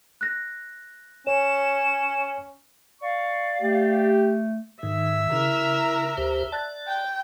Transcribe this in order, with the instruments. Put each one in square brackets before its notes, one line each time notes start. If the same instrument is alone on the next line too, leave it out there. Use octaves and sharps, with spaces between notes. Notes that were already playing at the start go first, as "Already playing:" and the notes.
[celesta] F#6 A#6
[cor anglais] C#4 [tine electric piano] C#5 [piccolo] E7
[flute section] D5 F5 [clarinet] C#6
[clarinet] A3 [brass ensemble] G4
[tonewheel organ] G#2 [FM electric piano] D#3 [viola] E5
[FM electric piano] C#3 [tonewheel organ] E4 [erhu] A#4
[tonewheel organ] D2 G4 C5
[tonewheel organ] D5 [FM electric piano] A5 F#6 A6
[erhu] G5